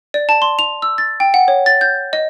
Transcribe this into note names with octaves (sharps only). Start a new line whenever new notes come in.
D5
A5
C6
F7
E6
A6
G5
F#5
C#5
A6
G6
D#5